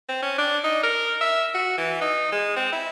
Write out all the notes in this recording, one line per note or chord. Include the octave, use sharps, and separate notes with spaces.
C4
C#4
D4
D#4
A#4
E5
F#4
E3
D#4
G#3
C4
E4